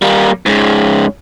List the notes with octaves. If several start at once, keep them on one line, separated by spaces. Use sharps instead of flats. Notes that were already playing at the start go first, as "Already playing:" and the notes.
G3 A#3
G#2 C#3